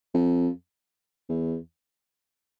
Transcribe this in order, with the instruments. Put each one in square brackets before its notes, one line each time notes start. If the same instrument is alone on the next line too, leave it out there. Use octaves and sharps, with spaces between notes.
[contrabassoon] F2
E2